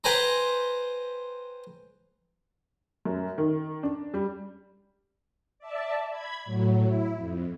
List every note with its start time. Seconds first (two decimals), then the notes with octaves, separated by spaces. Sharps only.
0.04 B4 C5 G5 G#5 A#5 B5
3.05 F#2
3.38 D#3
3.83 D4
4.14 G3
5.59 D5 E5 A5
6.10 B5 G#6
6.45 A2 F#3
6.85 E4
7.15 F2